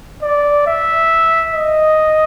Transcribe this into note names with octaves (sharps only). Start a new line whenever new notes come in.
D5
E5
D#5